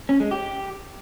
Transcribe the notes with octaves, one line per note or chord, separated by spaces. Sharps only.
C#4
G#3
G4